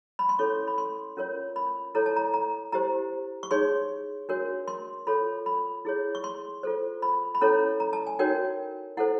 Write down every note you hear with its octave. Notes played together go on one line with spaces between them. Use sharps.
B5
C6
C#4 E4 A4 C#5 C#6
B5
C6
C#4 F4 A#4 C#5
B5
E4 A4 C#5 A#5
A5
A#5
A#5
E4 G4 C5 A#5
C#6
D#4 G#4 C#5 C6
D4 F#4 A#4 C#5
C6
F4 A4 C#5 B5
B5
E4 G#4 C#5
C#6
C6
F4 A4 C5
B5
B5
C#4 E4 A4 C#5 A#5
A#5
A5
G#5
D#4 F#4 A#4 C#5 G5
E4 A4 C5 F#5